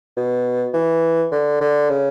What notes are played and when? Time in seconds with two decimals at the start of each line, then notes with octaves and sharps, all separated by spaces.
0.17 B2
0.74 E3
1.32 D3
1.61 D3
1.89 C#3